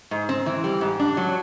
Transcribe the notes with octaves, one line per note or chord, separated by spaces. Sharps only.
G#2
C4
E3
G3
G#2
D4
F#3